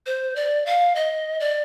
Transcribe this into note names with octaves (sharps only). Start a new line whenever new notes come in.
C5
D5
F5
D#5
D5